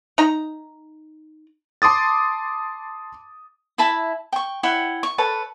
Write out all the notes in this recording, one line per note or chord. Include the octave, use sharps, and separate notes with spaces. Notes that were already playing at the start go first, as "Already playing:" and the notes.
D#4 A#5
A5 C6 D6 D#6 A6
E4 E5 A5 B5
G5 C#6
E4 C#5 F#5 G5
C#6
A4 B4 C#5 A5